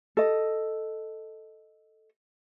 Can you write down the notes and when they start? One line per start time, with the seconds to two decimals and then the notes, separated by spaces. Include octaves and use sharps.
0.17 A4 D#5